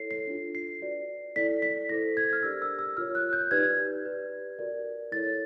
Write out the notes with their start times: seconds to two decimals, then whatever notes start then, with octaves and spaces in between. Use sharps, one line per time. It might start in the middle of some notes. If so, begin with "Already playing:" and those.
Already playing: E4 A4 C#5 C7
0.11 C7
0.27 D4 F4 A4
0.55 C7
0.82 F#4 B4 D5
1.36 E4 A4 D5 B6
1.62 B6
1.89 E4 A4 C5 A#6
2.17 G#6
2.33 F6
2.43 D4 G4 A#4 D5 E6
2.62 E6
2.79 E6
2.97 F4 A#4 C#5 F6
3.15 F#6
3.33 G6
3.51 D#4 G4 B4 D5 G#6
4.05 G4 B4 D5
4.59 F#4 A#4 D5
5.12 E4 A4 C#5 A6